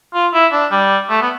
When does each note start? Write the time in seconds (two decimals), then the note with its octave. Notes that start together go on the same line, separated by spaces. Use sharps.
0.14 F4
0.34 E4
0.52 D4
0.71 G3
1.10 A3
1.21 B3